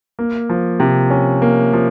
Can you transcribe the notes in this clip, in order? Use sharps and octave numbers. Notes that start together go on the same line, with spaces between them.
A#3
F3
C3
C#4
A#3
F3